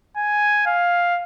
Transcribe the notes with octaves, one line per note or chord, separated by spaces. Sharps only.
G#5
F5